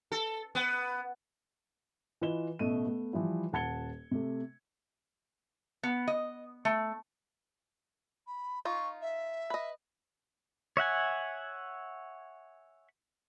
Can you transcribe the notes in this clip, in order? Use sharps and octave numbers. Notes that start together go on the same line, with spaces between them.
A4
B3
E3 F4 B4 D#5 E7 G7
A1 B2 A3 D#7
A3 B3
E3 F3 G3 E4
D#1 F#5 A5 G#6 C#7 G7
C3 A3
B3
D#5
A3
B5
D#4 F4 C#6
E5
B4 D#5
C#5 E5 F#5 G#5